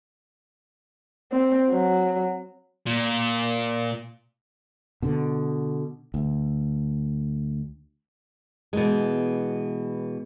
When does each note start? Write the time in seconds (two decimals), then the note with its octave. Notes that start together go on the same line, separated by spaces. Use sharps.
1.32 C4
1.71 F#3
2.87 A#2
5.02 B2 D3
6.14 D2
8.73 B2 E3 G#3